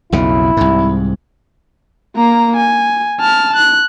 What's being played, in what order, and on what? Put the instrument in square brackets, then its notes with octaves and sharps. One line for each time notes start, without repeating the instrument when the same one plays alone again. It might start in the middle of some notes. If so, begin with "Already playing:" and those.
[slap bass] B1 F2 C#3 [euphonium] E4
[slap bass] C2 G#2
[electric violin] A#3 A#5
G#5
A5 F6
F#6